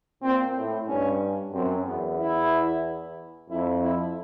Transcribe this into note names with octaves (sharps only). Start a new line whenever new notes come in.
A#2 C4
A2
G2 C#4
F#2 C4
E2 B3
E4
F2 E4
E4